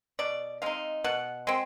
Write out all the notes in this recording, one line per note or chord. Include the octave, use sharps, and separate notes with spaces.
B2 D5
G#3 C4 D#4 F5
B2 F#5
G#3 C4